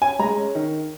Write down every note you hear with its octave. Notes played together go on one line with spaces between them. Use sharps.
C#4 G#5
G#3 A#5
C#4
D#3